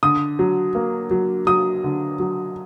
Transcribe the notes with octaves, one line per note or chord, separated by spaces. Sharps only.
D3 D#6
F#3
A#3
F#3
F#3 D#6
D3
F#3